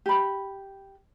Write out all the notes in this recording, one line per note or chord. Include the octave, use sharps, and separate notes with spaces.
G4 B5